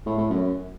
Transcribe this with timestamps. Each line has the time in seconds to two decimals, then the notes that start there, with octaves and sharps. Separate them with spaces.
0.06 A2
0.18 A2
0.30 F#2